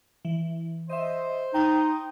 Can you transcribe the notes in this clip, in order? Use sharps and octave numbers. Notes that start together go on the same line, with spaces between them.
E3
C5 D#5 E5
D#4 G5 D#6